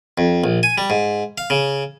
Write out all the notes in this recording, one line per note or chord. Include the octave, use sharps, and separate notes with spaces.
F2
A#1
G#5
G3
G#2
F5
C#3